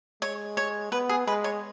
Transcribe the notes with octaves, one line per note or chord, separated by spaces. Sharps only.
G#3 C#5
C#5
B3 B4
G#4
G#3 B4
C#5